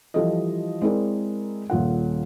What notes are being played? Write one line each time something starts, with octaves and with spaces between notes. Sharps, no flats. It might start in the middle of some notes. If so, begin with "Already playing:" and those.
E3 F3 G3 G4 A4 D#5
G#3 C4 E4 G#4 A#4 D5
D#1 A#2 F4 F#5